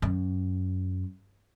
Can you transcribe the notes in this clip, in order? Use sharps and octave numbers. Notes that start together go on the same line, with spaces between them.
F#2